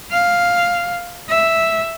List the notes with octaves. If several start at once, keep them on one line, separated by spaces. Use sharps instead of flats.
F5
E5